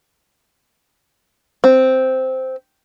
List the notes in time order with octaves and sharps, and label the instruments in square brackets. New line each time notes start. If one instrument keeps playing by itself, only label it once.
[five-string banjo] C4